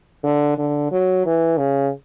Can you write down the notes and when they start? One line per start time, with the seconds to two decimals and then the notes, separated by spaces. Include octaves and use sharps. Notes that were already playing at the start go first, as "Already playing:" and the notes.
0.24 D3
0.58 D3
0.92 F#3
1.26 E3
1.59 C#3